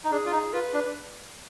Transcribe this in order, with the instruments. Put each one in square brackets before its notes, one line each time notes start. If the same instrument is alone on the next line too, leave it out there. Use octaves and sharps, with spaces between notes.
[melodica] D#4
[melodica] D4 [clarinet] G#4
[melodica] F4
D#4
[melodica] F4 [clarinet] B4
[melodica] D4